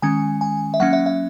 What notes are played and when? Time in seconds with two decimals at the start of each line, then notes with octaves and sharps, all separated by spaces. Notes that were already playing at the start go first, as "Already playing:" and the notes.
0.02 D#3 G#3 C#4 G#5
0.41 G#5
0.74 E5
0.80 F#3 A#3 C#4 F#5
0.93 E5
1.06 E5